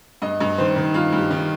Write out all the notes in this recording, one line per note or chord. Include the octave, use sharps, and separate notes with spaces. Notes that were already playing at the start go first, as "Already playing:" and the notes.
G2 D#5
G2
D#3 C5
D#3
G2 F4
G2
G4
D#3